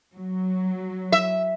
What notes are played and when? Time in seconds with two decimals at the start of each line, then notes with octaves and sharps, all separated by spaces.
0.15 F#3
1.12 E5